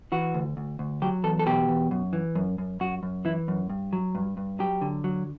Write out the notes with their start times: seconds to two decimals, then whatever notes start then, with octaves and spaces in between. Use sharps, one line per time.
0.12 E3 F#4
0.34 D2
0.57 D2
0.79 D2
1.02 F#3 G4
1.24 E2 A4
1.39 A4
1.46 B2 G4
1.69 E2
1.91 F#2
2.13 E3
2.35 F#2
2.58 F#2
2.80 F#2 F#4
3.03 F#2
3.25 E3 E4
3.48 F#2
3.70 G2
3.93 F#3
4.15 G2
4.37 G2
4.59 F#3 G4
4.81 D3
5.04 F#3